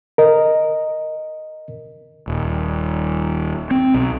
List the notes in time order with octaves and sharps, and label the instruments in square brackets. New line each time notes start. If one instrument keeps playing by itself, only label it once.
[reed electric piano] A#4 D#5
[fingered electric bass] D#1
C4
B1